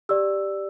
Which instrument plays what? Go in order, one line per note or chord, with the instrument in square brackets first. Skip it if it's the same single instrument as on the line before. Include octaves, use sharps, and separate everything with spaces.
[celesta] G4 D5 E6